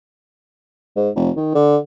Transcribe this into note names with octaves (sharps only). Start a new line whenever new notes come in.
G#2
F1
D#3
D3